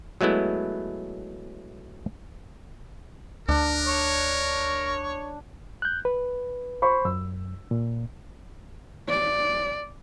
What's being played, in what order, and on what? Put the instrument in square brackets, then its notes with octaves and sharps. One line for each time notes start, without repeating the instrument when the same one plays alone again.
[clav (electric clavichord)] F#3 G#3 A3 B3 E4
[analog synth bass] D2 [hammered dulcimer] D4 [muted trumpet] A#4
[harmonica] C#5
[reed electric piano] F#6 G6
B4
[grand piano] C5 B5 C#6
[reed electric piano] F#2 [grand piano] E6
[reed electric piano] A#2
[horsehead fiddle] D5